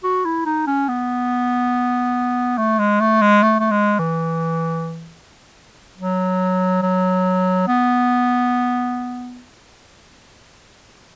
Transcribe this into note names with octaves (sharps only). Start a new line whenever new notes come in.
F#4
E4
D#4
C#4
B3
A3
G#3
A3
G#3
A3
A3
G#3
E3
F#3
F#3
B3